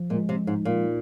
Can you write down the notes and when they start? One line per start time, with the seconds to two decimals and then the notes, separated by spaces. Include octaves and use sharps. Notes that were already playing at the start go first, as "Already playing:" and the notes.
Already playing: F3
0.10 A#2 G#3
0.29 C3
0.47 G#2 D#4
0.65 A#2
0.84 D#4